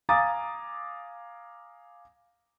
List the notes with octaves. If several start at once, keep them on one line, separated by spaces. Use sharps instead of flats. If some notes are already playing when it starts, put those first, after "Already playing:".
F5 G#5 A#5 D6 D#6 A6